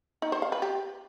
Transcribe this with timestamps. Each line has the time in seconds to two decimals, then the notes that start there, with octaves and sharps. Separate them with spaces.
0.22 D#4
0.32 C5
0.42 F5
0.52 B4
0.62 G4